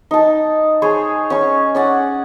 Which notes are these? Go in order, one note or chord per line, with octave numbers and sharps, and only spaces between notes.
D#4 A5
G#4 C5 C#5
C#4 C#6
C#4 D5 F#5